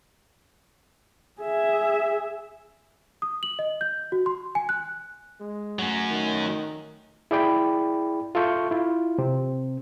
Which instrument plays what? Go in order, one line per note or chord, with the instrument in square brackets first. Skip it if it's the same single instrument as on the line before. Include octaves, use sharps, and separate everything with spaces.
[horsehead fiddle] G#4 E5
[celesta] D#6
F#7
D#5
G6
F#4
C6
G#5
F#6
[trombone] G#3
[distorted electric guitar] F#3 C#4 [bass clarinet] A3
[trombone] D#3
[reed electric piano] E4 G#4 D5 G5 B5
F4 A4 E5 A5 C#6 G6
E4 F4
C3 C4